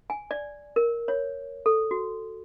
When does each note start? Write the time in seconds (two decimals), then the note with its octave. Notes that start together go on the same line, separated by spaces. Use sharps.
0.10 G#5
0.31 D5
0.76 A#4
1.08 C#5
1.66 A4
1.91 F#4